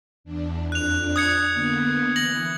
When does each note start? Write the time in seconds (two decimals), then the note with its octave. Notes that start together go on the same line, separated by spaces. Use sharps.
0.24 E2 D4
0.72 F2 D4 F#6 F7
1.16 D#6 G#6 C#7
1.54 D3 A#3 B3
2.16 E3 A#6 F#7